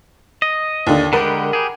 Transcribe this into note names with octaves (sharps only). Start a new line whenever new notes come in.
D#5
D#2 D3
D3 G#3 G4 A#4 F#5 B5
G4 G#4